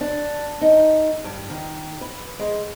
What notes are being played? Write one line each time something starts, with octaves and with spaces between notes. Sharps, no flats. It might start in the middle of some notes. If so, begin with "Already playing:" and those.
D4
D#4
G2
D#3
B4
G#3